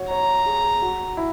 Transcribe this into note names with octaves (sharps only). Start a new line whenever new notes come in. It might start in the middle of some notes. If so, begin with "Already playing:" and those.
Already playing: F#4 C#5
C#5 A#5
G#4
F#4
E4